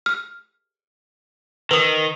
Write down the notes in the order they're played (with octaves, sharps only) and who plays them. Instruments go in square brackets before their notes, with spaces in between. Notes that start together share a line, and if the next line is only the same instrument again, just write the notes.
[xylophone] F6
[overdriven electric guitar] D#3 [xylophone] B4 D#6